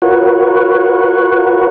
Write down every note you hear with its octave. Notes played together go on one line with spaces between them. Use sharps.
F4 F#4 A#4 B4 C#5 F#5